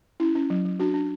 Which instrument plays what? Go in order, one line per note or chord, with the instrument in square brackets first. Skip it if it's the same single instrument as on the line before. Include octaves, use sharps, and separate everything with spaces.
[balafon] C#4 E4
C#4
F#3
F#3
D4 F#4
D4